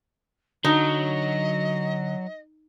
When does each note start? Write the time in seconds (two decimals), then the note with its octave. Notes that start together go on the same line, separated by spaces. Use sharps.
0.65 D3 F#3 D#4 D#5